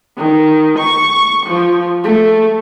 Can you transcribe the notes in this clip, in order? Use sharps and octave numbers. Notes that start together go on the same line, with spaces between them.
D#3
C#6
F3
A3